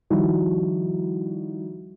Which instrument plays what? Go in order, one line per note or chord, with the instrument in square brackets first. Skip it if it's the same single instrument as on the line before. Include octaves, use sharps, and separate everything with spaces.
[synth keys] D#3 F3 G3 D#4 E4 F#4